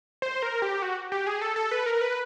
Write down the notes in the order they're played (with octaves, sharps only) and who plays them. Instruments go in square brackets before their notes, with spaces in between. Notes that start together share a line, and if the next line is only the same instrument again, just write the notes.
[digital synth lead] C5
A#4
G4
F#4
G4
G#4
A4
A4
B4
A#4
B4